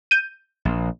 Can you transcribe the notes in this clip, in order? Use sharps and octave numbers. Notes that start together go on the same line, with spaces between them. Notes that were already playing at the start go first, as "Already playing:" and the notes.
G6 D#7
A#1